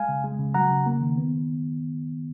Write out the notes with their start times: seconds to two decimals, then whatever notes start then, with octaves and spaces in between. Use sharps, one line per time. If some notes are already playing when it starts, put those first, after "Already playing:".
Already playing: G#3 F5 G#5
0.09 C#3
0.24 G#3
0.39 C#3
0.54 F#3 F#5 A#5
0.71 C#3
0.86 A#3
1.01 D#3
1.18 B3